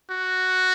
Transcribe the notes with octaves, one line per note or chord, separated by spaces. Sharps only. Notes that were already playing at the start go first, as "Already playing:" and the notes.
F#4